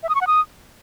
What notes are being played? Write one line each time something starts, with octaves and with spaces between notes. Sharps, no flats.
E5
D#6
C#6
F#5
D#6